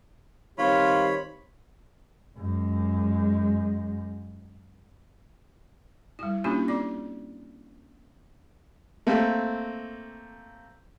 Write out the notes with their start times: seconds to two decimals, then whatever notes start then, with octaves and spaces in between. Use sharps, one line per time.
0.58 D#3 G3 C4 F4 C#5 B5
2.37 F#2 G#3
6.19 G3 E4
6.44 A#3 C#4 D4 E4 F4 G4
6.68 C4 D5 D6
9.07 A3 A#3 C4